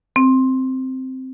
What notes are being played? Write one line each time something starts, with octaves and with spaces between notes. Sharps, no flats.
C4